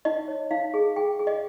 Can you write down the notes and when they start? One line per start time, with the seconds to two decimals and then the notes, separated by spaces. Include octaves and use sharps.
0.05 D#4 D#5
0.28 C#5
0.51 D#4 F5
0.74 G#4
0.96 G#4 G5
1.19 G#4
1.27 D#5